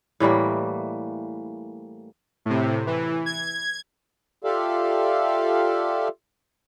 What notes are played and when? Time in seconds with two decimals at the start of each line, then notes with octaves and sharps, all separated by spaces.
0.20 A2 E3 G3 A#3
2.46 A2 C3
2.87 E3
3.26 G#6
4.44 F4 G4 A4 D5 E5 F5